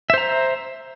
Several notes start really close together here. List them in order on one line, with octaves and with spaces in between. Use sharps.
E5 C5 A#5